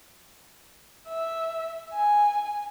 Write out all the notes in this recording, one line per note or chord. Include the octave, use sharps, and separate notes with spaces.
E5
G#5